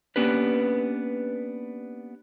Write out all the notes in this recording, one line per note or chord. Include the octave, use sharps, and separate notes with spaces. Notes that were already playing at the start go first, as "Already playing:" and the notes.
A#3 B3 C#4 D4 G4 B4